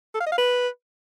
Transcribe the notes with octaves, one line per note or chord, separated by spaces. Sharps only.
A4
F5
D#5
F5
B4